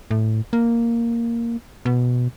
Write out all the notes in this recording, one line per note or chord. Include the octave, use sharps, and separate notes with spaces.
A2
A#3
B2